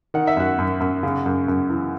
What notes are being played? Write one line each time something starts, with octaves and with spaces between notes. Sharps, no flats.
D#3 F#5
E5
F#2 F#4 F#5
F#2
F#2
C#3
F#2
F#2
E3